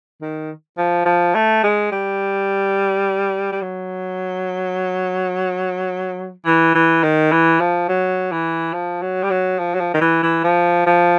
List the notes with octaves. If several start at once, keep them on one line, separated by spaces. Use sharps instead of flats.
D#3
F3
F3
A3
G#3
G3
G3
F#3
E3
E3
D#3
E3
F3
F#3
E3
F3
F#3
G3
F#3
F3
F#3
F3
D#3
E3
E3
F3
F3